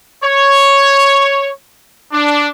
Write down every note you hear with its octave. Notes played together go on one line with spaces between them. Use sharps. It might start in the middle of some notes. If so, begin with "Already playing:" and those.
C#5
D4